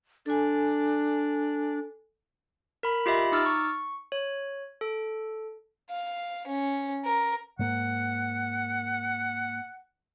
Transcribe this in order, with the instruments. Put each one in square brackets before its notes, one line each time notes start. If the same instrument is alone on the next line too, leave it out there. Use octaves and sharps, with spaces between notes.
[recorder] D4 [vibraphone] A4 G#5
[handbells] A#4 B5
F4 G4 D#5 E5 B5
D#4 D6 E6 F6 A6
C#6
C#5
A4
[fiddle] F5
C#4
A#4
[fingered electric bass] G#2 A#3 [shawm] F#5